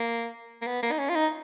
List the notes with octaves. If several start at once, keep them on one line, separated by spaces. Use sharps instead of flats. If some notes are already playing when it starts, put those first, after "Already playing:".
Already playing: A#3
A#3
B3
A#3
D#4
C#4
F4
D#4